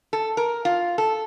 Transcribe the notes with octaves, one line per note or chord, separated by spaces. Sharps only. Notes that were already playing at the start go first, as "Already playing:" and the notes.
A4
A#4
F4
A4